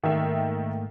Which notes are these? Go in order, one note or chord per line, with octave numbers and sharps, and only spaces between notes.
G#2 D#3 A3 A#3 E5